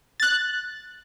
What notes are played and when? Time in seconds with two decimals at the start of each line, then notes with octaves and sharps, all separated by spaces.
0.20 F#6 A6